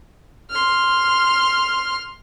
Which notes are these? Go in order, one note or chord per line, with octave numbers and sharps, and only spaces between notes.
C6 F6